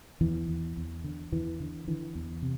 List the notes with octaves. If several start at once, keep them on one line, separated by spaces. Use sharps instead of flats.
E2 E3
E2
E2
D3
E2 E3
D3
D3 E3
E2
C3